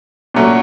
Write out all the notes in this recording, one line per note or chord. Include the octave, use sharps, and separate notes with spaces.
A#2 F#3 A3 C#4